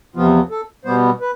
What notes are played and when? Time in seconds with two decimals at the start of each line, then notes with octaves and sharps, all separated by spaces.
0.16 E2 C3 F3 B3 F4
0.51 A4
0.85 B2 G3 B3 C5
1.21 B4